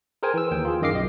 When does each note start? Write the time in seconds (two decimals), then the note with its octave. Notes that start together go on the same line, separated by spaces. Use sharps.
0.23 G#4 A#4 C5 G5 G#5
0.34 E3 E6
0.51 D#2 G5
0.65 F4 G#4
0.82 F#2 D#3 D#5 F5 D6 C7
0.93 B1 D#5